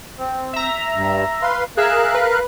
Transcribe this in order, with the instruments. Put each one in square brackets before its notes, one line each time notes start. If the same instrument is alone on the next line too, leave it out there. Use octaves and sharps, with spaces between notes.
[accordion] C4
[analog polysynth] E5 A#5
[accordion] G2
B4 F5 C6
[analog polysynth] G#4 E5 [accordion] A#4 F5 F#6
[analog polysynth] B4